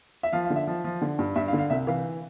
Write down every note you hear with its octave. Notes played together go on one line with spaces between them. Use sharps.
E5
F3 F5
F5
D3
E5
F3
F3
D3
G2
G2 E5
F5
D3
F5
C2 E5
E3 F5